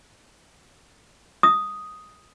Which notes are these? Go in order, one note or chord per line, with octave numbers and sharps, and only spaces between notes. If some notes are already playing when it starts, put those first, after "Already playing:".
D#6